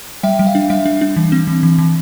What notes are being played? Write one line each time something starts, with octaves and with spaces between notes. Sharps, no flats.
G3 E5 G5
G3
F5
D4
G3 E5
D4
D4
E3
C4
E3
E3
E3